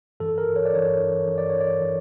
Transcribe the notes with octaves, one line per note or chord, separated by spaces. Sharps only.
G2 E3 A4
A#4
C#5
D5
G2 E3 C#5
G2 E3
D5
C#5
D5
E3